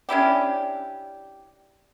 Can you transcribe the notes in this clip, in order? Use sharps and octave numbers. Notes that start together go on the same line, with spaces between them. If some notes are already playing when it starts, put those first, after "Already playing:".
C#4 D4 E4 G4